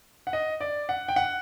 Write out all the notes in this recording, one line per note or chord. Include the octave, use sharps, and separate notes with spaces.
F#5
D#5
D5
F#5
G5
F#5